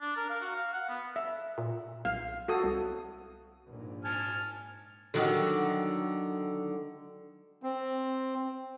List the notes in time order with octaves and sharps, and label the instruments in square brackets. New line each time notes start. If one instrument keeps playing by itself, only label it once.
[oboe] D4
A#4
F5
F#4
F5
F#5
B3
[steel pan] E5
[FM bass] A#2
[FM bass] B1 [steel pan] F5
[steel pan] F#4 A4 D#6
[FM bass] C2
[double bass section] A#1 G#2
[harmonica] G#5 A5 F6
[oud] D3 D#3 F#3
[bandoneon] C4